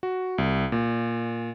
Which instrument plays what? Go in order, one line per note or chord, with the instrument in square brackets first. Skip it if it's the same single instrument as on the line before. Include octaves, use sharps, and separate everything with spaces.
[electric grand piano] F#4
C2
A#2